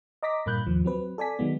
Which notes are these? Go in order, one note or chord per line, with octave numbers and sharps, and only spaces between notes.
D#5 A#5 D6 A#6 B6
G2 A#2 A#3 B5 F#6 G6
D#2 G#2 F3
F#3 C4 B4
A4 D5 G#5 B6
D#3 F#3 G#3 B3